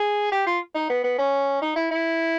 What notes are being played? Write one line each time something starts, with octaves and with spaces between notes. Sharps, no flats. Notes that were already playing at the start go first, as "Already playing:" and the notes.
Already playing: G#4
G4
F4
D#4
B3
B3
C#4
D#4
E4
E4